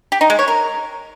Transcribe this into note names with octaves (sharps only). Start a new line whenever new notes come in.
G4
D#4
G#3
C#5
A#4